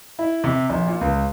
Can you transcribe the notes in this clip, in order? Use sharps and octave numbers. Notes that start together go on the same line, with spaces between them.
E4
C3
A#1
A#2
C#2